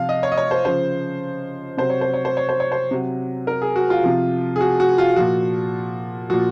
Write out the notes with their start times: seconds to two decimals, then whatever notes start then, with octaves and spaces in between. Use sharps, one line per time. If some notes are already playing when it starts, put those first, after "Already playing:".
Already playing: C3 F3 F5
0.09 D#5
0.23 C#5
0.32 D#5
0.37 C#5
0.51 C5
0.65 C#3 F3 C5
1.77 C3 F#3 C5
1.90 C#5
2.01 C5
2.14 C#5
2.25 C5
2.37 C#5
2.49 C5
2.60 C#5
2.72 C5
2.91 C3 F#3
3.47 A#4
3.62 G#4
3.76 F#4
3.90 F4
4.04 C3 F3
4.56 G#4
4.61 F#4
4.80 F#4
4.98 F4
5.17 A#2 F3 F#4
6.30 A#2 F3 F#4